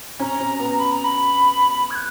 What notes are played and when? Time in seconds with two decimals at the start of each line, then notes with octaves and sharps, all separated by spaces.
0.20 C#4 A#5
0.40 C#4
0.60 B3
0.79 B5
0.91 A#5
1.04 B5
1.90 G#6
1.95 F#6